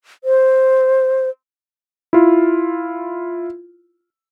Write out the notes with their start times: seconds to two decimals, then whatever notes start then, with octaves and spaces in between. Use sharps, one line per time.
0.24 C5
2.13 E4 F4